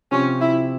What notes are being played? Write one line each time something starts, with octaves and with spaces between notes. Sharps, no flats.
C3 F3 C4 C#4
E4